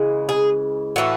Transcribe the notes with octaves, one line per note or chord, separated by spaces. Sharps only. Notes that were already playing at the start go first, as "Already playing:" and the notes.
Already playing: C#3 E3 G#3
G#4
A2 E3 A3 F#4